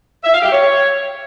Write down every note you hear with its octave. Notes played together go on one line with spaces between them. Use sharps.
E5
F5
G4
C#5